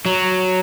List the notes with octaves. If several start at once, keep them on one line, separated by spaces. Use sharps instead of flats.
F#3